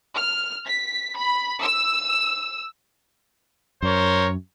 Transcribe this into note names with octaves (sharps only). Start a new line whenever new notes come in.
F6
B6
B5
E6
F#2 A#4 C5 C#5